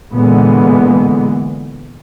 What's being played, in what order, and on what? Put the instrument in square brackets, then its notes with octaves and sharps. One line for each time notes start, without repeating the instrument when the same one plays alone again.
[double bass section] A#2 D3 E3 G#3 B3